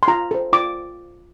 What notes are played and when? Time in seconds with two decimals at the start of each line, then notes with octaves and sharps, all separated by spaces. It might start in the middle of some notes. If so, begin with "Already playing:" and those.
0.03 C6
0.08 F4 A#5
0.31 A4 C5
0.53 F4 D6